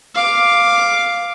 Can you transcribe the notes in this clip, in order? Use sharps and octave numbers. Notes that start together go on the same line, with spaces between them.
F5 D6